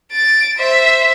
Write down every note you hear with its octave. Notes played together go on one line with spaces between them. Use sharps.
A6 D7
C5 E5